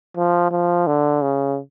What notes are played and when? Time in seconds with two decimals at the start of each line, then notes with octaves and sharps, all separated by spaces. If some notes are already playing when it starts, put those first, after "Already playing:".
0.17 F3
0.51 F3
0.87 D3
1.22 C#3